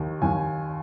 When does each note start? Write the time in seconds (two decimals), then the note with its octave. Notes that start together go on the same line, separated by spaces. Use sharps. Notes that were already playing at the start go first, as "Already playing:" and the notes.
Already playing: D#2 D#3
0.22 D#2 D#3 G#5